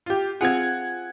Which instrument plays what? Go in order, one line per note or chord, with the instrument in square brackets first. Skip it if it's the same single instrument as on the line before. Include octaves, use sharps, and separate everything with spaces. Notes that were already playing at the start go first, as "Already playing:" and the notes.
[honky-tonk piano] F4 G4
[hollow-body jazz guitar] C4 F4 G#4 [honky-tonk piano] F#5 G#6